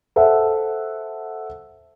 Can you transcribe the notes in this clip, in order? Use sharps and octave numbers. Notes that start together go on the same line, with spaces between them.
A4 C5 E5 F#5